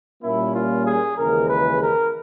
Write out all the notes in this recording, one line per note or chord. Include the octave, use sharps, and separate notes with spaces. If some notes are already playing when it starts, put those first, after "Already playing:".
A#2 G3 A#3 C#4 E4
F4
G#4
D#2 C#3 E3 G#3 A#4
B4
A#4